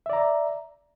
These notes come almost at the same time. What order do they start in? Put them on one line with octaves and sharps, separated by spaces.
E5 D5 A#5